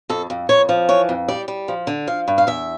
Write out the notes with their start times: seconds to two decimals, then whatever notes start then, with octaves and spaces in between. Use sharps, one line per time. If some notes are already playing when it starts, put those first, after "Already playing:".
0.09 F2 A4
0.30 F2
0.49 F2 C#5
0.69 F3
0.89 E3 C#5
1.09 F2
1.28 G3 D5
1.48 G3
1.68 F3
1.87 D3
2.07 F3 F5
2.28 G2
2.38 F5
2.47 E2 E5